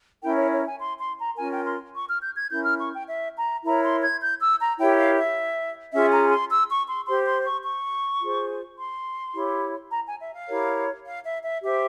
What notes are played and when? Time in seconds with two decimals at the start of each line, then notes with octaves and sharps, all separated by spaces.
0.23 C#4 E4 A#4 G5
0.37 C#5
0.51 C#5
0.65 G#5
0.80 C6
0.99 C6
1.18 A#5
1.36 C#4 F4 A#4 G#5
1.51 G5
1.65 C6
1.94 C#6
2.07 F6
2.21 G6
2.36 G#6
2.50 C#4 E4 A#4 G6
2.64 F6
2.79 C#6
2.93 G5
3.08 E5
3.36 A#5
3.65 E4 A#4 C#5 A#5
3.83 C6
4.03 G#6
4.21 G6
4.40 E6
4.59 A#5
4.78 E4 G4 A#4 C#5 G5
4.97 F5
5.17 E5
5.92 C#4 F4 G#4 E5
6.11 A#5
6.30 C6
6.50 E6
6.68 C#6
6.87 C6
7.06 G4 C5 C6
7.25 C6
7.44 C#6
7.63 C#6
8.20 F4 G#4 C5
8.78 C6
9.34 E4 G4 C#5
9.91 A#5
10.06 G#5
10.20 E5
10.33 F5
10.48 E4 G4 A#4 C#5
11.05 F5
11.24 E5
11.43 E5
11.62 G4 C5 E5